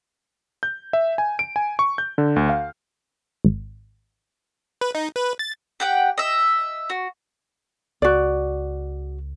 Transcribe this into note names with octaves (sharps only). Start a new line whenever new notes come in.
G6
E5
G#5
D7
G#5
C#6
G6
D3
D2
F5
G#1
B4
D#4
B4
A6
G4 F#5 G5
D#5 E5
F#4
C#2 F#4 D5